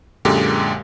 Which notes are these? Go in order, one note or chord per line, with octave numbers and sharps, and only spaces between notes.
F#2 A#2 D3 G#3 G4